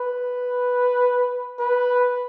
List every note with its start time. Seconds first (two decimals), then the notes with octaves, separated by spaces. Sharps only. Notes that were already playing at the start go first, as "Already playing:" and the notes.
Already playing: B4
1.60 B4